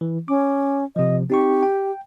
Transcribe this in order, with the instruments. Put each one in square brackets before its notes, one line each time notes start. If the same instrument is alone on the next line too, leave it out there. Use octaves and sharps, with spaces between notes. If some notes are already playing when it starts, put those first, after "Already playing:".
[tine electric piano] E3
[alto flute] C#4 [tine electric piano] D6
[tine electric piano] C3 F3 [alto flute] D#5
[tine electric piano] C4 D#4 C#6 [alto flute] G4
[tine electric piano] G5